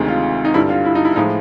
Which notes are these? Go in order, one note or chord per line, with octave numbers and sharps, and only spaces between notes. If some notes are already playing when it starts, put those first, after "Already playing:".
Already playing: D2 C3 D#3 G#3
F4
D#4
G2 D3 G3 E4
F4
E4
D#4
E4
A2 F3 G#3 D#4